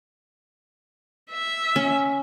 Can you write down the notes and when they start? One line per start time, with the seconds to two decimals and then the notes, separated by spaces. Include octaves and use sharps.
1.32 E5
1.76 C#4